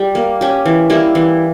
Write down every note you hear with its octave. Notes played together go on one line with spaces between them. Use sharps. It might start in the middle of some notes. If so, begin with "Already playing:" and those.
Already playing: G3
A#3
C#4 G4
E3
G3 A#3 E4
E3